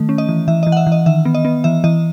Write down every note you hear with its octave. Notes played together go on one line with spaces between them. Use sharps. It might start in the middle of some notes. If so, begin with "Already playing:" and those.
Already playing: D#3 A3
C#4
D#5
E3
E3 E5
D#5
E3
F#5
E5
E3
D#5
D#3 E5
B3
D#5
B3
E3 E5
E3 D#5